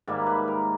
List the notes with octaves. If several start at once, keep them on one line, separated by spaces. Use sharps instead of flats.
G#2 D#3 G3 A#3 E5
B4
A#4